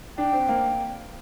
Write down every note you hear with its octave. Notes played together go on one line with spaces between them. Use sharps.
D4 G5
C4
A#3